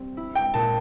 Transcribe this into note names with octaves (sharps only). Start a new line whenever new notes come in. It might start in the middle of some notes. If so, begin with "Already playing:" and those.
Already playing: G3 C4
E4
G5
A#2 A5